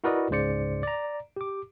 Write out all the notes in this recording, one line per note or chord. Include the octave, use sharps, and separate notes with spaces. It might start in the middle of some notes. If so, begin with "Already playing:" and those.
E4 F#4 A#4 B4 D5 D#5
C#2 G#2 C#3 C5 D5 C#7
D5 A#5
G4 D6